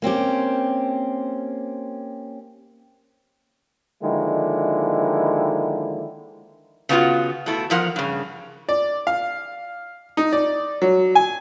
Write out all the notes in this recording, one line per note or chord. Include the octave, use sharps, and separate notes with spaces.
A#3 C4 C#4 G4
D3 D#3 F3 G#3 A#3 E4
C#3 A3 B3 D#4 F4 F#4
B2 A3 E4
E2 F3 A#4 F#5
G2 C#3
D5
F5
D#4
D5
F#3
G#5